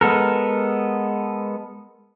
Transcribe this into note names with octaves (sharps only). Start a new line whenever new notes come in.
G#3 B3 A4 A#4